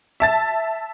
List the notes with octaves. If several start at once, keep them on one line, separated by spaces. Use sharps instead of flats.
E5 A5 A6